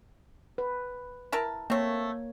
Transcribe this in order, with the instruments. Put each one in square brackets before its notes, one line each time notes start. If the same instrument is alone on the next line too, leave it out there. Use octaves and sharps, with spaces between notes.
[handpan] B4
[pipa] E4 A#4 A5
[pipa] A3 C4 [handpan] A#3 C#5